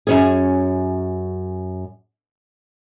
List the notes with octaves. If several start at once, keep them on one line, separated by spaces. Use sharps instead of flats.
F#2 C#4 G#4